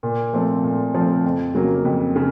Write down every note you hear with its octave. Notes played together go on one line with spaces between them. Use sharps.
A#2
F3 A3 C4
A#2
F3 A3 C4
F2
C#3 F#3 A#3
F2
C#3